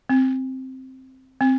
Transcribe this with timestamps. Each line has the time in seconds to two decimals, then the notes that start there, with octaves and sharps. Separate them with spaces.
0.09 C4
1.41 C4